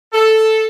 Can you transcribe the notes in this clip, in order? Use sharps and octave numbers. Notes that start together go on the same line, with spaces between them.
A4